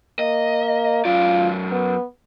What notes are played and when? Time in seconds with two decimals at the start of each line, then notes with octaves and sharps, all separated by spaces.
0.19 A#3 D#5
1.05 F#2 F4 D5
1.71 B3